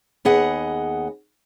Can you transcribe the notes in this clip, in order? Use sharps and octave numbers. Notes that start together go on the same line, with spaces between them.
D#2 B3 G#4 D#5 F#5